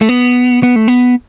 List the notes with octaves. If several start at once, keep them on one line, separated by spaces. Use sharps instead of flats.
A3
B3
B3
A3
B3